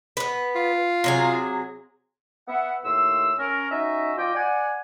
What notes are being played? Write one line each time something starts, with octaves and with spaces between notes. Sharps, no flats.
B3 B4
F4
C3 F#3 G#4
B3 E5 F#5
D#2 A2 C6 E6
C#4 A#4
C#4 D#4 F#4 D#5 E5
F3 F4 D5 D#5 G5
D5 F#5 G#5